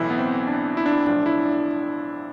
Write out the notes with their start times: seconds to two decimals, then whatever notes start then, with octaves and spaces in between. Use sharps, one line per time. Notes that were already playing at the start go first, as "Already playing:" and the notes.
Already playing: B1 A2 E3 E4
0.10 B3
0.18 C4
0.47 D4
0.77 E4
0.86 D4
0.93 E4
1.06 B1 A2 F3 D4
1.26 E4
1.45 D4